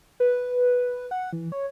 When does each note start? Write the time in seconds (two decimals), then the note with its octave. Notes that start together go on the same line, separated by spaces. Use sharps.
0.20 B4
1.11 F#5
1.33 E3
1.52 C#5